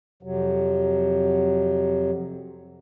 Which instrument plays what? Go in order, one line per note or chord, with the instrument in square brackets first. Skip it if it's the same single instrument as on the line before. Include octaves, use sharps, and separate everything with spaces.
[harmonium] F2 C3 F#3